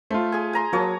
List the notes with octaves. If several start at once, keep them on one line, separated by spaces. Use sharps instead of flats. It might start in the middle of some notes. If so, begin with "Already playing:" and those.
A3 F4 C5
G#4 G#5
G#5 A#5 C6
F#3 A#3 C#5 A5 D#6